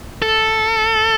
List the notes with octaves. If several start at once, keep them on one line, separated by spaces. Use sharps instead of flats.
A4